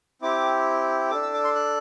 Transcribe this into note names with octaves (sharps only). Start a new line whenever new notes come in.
C4 E4 G4 D6
D4 A4 D6
E6
D6
C6
F#6